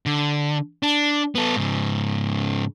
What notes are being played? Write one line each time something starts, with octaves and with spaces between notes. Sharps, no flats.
D3
D4
B3 A4
G#2 C#3